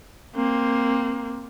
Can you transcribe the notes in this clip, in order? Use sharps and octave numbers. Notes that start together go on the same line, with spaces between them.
A#3 C4